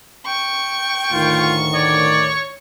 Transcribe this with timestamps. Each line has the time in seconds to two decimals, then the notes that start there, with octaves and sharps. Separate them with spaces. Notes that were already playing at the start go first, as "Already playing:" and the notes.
0.27 G5 C#6
1.12 D2 A2 D#3 F4
1.75 C#5 D5